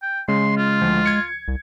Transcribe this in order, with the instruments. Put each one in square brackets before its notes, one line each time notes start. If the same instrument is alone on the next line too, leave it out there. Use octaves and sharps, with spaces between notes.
[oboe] G5
[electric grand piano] C#3 [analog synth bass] G#3 [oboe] C6
[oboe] F4
[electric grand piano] D2 F3
G#6 C#7
[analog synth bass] C2